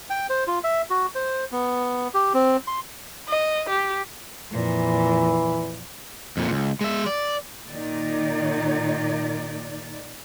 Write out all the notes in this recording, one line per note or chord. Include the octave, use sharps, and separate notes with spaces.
G5
C5
F4
E5
F#4
C5
B3
G4
C4
C6
D#5
G4
F2 A#2 E3
F2 A#2
C#2
G#3 E5
D5
A#2 D#3 D#4 D5